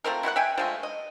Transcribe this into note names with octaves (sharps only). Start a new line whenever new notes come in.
F3 A3 C4 A#4
E4 F#4 C5 F#5
E5 G5 G#5
F3 G#3 A3
D#5